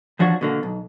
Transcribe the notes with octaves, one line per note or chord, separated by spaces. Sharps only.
E2 F3 D4 F#4 C#5
B2 D3 A#3
B1